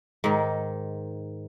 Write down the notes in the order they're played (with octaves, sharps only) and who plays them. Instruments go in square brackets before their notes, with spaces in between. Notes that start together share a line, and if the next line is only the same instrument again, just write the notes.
[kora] G#2 D#3